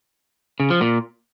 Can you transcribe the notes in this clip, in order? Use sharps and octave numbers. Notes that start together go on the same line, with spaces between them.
C#3
F3
A#2